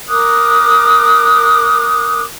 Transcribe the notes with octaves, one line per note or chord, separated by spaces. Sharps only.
A#4 D6 D#6 F#6